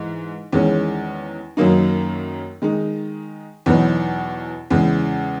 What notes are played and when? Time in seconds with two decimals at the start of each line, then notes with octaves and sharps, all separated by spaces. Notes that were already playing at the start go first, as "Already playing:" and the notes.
Already playing: G#2 E3
0.53 E2 D#3 G#3 C#4
1.57 F#2 D#3 F#3 A#3 D#4
2.62 D#3 G#3 D#4
3.66 E2 B2 F#3 B3 D#4
4.70 E2 C#3 G#3